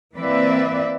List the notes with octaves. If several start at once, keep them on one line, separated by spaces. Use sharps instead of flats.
E3 A#3 C4 B4 D5 E5